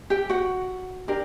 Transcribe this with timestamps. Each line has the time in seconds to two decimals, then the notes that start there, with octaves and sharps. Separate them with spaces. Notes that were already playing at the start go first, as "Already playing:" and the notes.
0.10 G4 G5
0.29 F#4 F#5
1.08 D4 G4 A#4